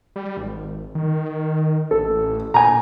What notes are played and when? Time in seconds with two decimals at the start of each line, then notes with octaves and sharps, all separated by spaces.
0.16 G3
0.37 G#1
0.95 D#3
1.91 A1 A4
2.54 A#2 G#5 A#5